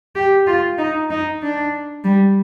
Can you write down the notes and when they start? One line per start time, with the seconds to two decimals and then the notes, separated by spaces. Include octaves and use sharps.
0.15 G4
0.47 F4
0.78 D#4
1.10 D#4
1.42 D4
2.04 G3